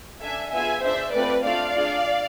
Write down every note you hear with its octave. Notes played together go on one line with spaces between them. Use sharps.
D4 A4 E5 G#5
B3 F4 G#4 E5 G#5
D4 G#4 C5 E5
A3 C4 F4 B4 D5
A3 D4 F4 D5 F5
D4 F4 G#4